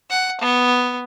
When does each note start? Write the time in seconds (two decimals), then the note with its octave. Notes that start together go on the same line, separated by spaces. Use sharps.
0.10 F#5
0.41 B3